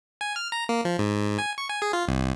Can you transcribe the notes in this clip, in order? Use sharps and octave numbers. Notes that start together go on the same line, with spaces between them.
G#5
F6
A#5
A#3
F3
G#2
G#5
C#6
G#5
G#4
F4
C2